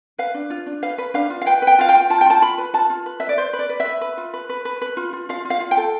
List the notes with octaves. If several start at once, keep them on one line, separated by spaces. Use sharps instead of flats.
B4 F5
D4
F4
D4
B4 F5
B4
D4 F5
F4
F5
B4 G5
B4
G5
F4 F5
G5
F4
F4 A5
G5
F4 A5
F4 B5
B4
F4 A5
F4
B4
B4 E5
D5
B4 C5
B4
D5
B4
E5
B4
B4
F4
B4
B4
B4
B4
F4
F4
F4 F5
F4
F5
F4
G5
A4